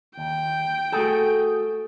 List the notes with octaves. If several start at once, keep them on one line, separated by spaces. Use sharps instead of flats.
D#2 G5
A3 F#4 G#4 A4